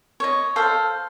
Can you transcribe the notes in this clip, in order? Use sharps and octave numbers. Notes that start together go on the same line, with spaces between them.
C#5 D#5
A4 C5 F5